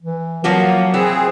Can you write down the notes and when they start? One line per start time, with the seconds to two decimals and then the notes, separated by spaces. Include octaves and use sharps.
0.02 E3
0.44 F3 F#3 A#3 F#4
0.94 E3 C4 G#4